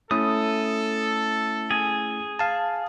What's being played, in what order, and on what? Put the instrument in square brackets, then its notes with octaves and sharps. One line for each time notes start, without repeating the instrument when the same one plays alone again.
[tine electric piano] A3 C#4 E4 [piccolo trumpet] A4 [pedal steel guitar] D#6
[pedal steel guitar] G#4
[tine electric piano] F5 A5